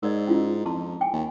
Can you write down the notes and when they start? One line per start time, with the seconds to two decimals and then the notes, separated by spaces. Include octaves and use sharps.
0.03 G#2 A#4 D5 D#5
0.27 C#4 E4 F4
0.66 F2 A5 A#5 C6
1.01 G5 G#5
1.13 D#2